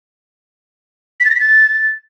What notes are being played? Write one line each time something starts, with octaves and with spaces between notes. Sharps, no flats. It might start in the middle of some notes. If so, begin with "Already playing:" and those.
B6
A6
A#6
B6
A6